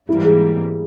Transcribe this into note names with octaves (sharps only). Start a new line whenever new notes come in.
G#2 E3 G3 A#3 E4
G#4